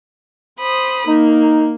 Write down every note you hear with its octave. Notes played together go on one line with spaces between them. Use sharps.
C5 B5 D#6
A#3 D#4